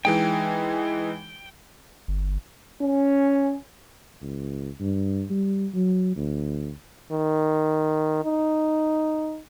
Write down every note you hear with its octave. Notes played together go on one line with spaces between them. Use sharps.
E3 G#3 D#4 G5
G1
C#4
C#2
G2
G3
F#3
D2
D#3
D#4